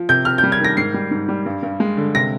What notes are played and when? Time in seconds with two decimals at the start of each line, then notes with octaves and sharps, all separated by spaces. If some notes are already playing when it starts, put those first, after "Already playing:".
Already playing: F3
0.09 C3 G6
0.25 C3 F6
0.38 G6
0.44 G3
0.52 G#6
0.60 D#3 A#6
0.77 G#2 C7
0.94 G3
1.11 G#2
1.29 G3
1.46 G2
1.63 G2
1.80 G#3
1.97 D3
2.15 C3 A#6